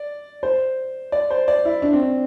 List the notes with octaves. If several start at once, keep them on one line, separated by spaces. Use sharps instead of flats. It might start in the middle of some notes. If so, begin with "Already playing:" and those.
Already playing: D5
C5
D5
C5
D5
E4
D4
C4
D4